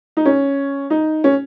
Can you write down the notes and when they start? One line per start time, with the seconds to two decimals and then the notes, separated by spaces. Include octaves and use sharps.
0.17 D#4
0.25 C#4
0.90 D#4
1.24 C#4